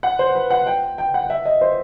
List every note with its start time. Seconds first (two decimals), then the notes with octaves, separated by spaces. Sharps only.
0.03 F#5
0.19 C5
0.35 B4
0.51 F#5
0.67 G5
0.98 G5
1.14 F#5
1.30 E5
1.45 D#5
1.61 C5